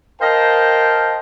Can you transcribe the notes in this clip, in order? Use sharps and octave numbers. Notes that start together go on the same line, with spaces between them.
A#4 C5 D#5 F5 G5 A5